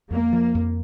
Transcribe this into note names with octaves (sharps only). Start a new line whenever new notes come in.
F2 A#3
F3
F2